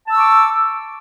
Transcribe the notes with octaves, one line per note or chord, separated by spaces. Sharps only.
A5 C#6 D6 E6